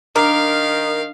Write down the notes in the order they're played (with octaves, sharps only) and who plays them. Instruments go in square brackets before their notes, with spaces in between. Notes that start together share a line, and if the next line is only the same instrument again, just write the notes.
[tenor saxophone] D#3 [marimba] D4 [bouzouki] A#4 [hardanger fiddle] F5